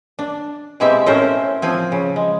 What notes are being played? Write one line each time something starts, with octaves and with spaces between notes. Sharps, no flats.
D4
B2 G#3 C4 E4 G4 E5
A2 A3 C4 C#4 A#4 C5
F3 C4 G#5
C#3
G#3